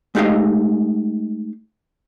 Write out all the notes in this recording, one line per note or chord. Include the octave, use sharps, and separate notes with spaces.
G#3 A3 D#4 G4 D#5 F5